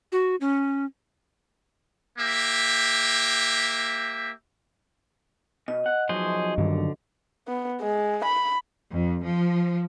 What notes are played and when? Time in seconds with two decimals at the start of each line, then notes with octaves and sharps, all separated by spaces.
0.12 F#4
0.41 C#4
2.18 A#3 G4 E5
5.68 B2 D#5
5.86 F#5
6.09 B1 F#2 F3 F#3 G#4 C5
6.58 G2 D3 D#3
7.48 B3
7.81 G#3
8.25 B5
8.92 F2
9.23 F3